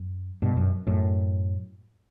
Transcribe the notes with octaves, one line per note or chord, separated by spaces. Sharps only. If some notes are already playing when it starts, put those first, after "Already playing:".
Already playing: F#2
G2 B2
F#2
F#2 A2